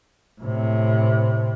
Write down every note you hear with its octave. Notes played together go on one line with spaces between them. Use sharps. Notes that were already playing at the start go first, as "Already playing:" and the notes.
A2 C3